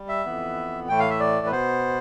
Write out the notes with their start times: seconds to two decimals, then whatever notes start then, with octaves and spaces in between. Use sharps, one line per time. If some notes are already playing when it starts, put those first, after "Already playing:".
Already playing: G3
0.09 E5
0.25 F2 E3 B3
0.89 A2 E3 A3 G5
0.99 F5
1.10 E5
1.20 D5
1.46 B4
1.51 B2 B3 C5